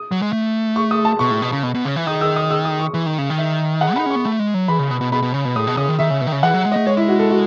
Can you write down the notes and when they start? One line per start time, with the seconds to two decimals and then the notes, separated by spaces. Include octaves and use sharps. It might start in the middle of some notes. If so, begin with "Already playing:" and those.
Already playing: D#6
0.12 F#3
0.22 G#3
0.33 A3
0.76 C#6
0.91 D#6
1.05 A5
1.19 B2 C#6
1.31 A2
1.42 B2
1.52 C#3
1.63 B2
1.75 B2
1.85 C#3
1.96 E3
2.07 D#3 D#6
2.21 E6
2.36 D#6
2.51 E6
2.65 D#6
2.80 C#6
2.94 E3
3.06 D#3
3.18 C#3
3.30 D#3
3.38 E5
3.81 F#5
3.96 D#4 B5
4.06 C#4 C#6
4.16 B3
4.25 A3
4.39 G#3
4.54 F#3
4.68 E3 B5
4.79 C#3
4.91 B2
5.01 B2
5.12 B2 B5
5.22 B2
5.34 C#3
5.45 B2
5.56 A2 D#6
5.67 B2
5.77 C#3 D#6
5.89 D#3
5.99 D#3 E5
6.10 C#3
6.21 B2
6.27 D#3
6.32 C#3
6.43 E3 F#5
6.54 F#3
6.65 G#3
6.72 D#5
6.76 A3
6.87 G#3 C#5
6.97 E4
7.08 F#4
7.19 A4
7.30 F#4